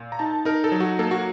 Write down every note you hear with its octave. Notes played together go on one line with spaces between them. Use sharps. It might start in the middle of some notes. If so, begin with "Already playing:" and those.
Already playing: A#2
A#5
D#4 A5
D#4 A#4
A4
F#3
F#4
A#3 A4
F#4